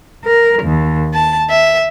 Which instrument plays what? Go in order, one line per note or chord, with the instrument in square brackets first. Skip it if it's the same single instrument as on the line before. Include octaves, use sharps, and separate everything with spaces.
[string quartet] A#4
D#2
A5
E5